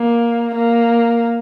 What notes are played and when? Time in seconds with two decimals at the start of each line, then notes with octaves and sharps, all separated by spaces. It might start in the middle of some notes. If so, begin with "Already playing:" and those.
Already playing: A#3
0.55 A#3